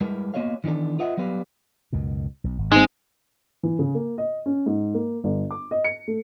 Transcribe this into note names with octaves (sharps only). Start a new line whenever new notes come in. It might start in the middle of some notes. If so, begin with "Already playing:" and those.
G3 G#3 E4 A#4 B4
A#3 B3 F#4 C#5 D#5 F5
D#3 E3 B3 D4 A4
F4 B4 D#5 E5 F#5
F#3 G3 B3 B4 F5
C#2 F#2 B2
B1
G#1
G#3 C4 D#4
E3
C#3
A#3
D#5
C#4
G#2
A#3
G1
D6
D#5
C#7
A3